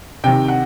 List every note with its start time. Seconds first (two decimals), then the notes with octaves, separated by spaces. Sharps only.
0.24 C3 D#3 G5
0.48 F#5